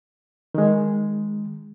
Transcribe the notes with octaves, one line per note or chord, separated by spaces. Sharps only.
D#3 G#3